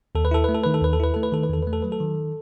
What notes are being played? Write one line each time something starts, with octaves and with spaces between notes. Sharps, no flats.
D#2 A4
B4
E4 A4
A3 B4
A4
D#3 B4
A4
D#2 B4
A4
E4 B4
A3 A4
B4
D#3 A4
B4
E2 A4
A3 B4
A4
F#3 B4
A4
D#3